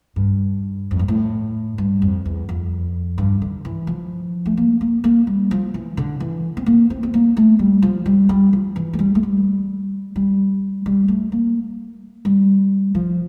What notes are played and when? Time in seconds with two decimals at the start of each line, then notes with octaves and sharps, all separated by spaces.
0.16 G2
0.91 F2
0.99 G2
1.08 A2
1.78 G2
2.02 F2
2.25 E2
2.49 F2
3.18 G2
3.42 D3
3.65 E3
3.87 F3
4.46 A3
4.57 A#3
4.81 A#3
5.04 A#3
5.27 G3
5.51 F3
5.74 E3
5.97 D3
6.20 E3
6.57 C4
6.66 A#3
6.90 C4
7.03 C4
7.14 A#3
7.37 A3
7.59 G3
7.82 F3
8.06 G3
8.29 G3
8.53 F3
8.76 E3
8.93 A3
8.99 G3
9.15 A3
9.23 G3
10.16 G3
10.86 G3
11.08 A3
11.32 A#3
12.25 G3
12.95 F3